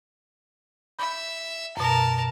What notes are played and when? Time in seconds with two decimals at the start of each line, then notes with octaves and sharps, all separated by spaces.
0.99 E5 B5 G6
1.77 F#2 B2 A#4 A5